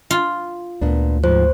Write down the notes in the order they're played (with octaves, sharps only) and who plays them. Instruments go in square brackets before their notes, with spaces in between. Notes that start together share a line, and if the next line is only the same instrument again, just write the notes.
[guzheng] F4
[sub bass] D2 [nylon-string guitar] A#2 B3 D4
[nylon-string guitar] G#2 F3 [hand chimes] C5